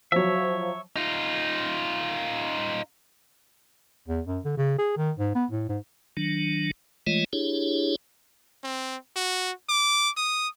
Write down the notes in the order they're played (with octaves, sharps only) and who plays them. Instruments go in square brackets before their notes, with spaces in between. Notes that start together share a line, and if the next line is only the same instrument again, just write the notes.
[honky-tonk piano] F3 F#3 [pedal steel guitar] C#5 E5
[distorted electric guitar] D#4 F4
[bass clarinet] E2
F#2
D3
C#3
G#4
D#3
G#2
B3
A2
G#2
[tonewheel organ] D#3 F#3 D4
E3 G#3 A3 F4 C#5 D#5
D4 E4 G4 G#4 C#5
[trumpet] C4
F#4
D6
D#6